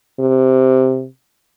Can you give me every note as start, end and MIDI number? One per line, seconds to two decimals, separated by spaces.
0.20 1.07 48